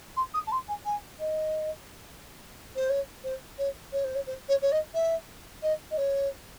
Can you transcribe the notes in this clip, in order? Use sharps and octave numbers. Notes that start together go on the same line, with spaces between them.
C6
D#6
A5
C6
G#5
G#5
D#5
C5
C#5
C5
C#5
C#5
C5
C#5
C5
C#5
C#5
D#5
E5
D#5
D#5
C#5